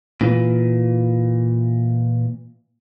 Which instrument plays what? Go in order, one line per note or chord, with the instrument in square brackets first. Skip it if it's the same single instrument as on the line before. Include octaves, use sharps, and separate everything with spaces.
[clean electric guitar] A#2 E3